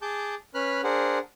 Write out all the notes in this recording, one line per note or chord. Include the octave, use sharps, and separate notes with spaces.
G#4 A5 D6 G6
C#4 B4 B5 F6 F#6
D4 G#4 A#4 C5 F#5